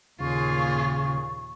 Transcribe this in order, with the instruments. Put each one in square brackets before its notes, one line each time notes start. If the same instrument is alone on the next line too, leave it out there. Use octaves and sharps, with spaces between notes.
[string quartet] D#2 A#2 [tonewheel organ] C#3 [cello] F4 G#4 [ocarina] C#6